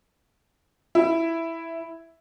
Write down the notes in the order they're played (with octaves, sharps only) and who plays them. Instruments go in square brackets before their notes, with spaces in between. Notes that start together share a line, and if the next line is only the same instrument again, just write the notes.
[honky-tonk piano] E4